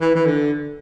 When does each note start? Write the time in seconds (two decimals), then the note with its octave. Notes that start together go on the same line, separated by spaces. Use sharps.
0.01 E3
0.15 E3
0.26 D3